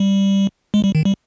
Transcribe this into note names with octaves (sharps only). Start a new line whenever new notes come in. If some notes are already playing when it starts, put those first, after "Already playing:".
Already playing: G3
G#3
G3
D#3
G3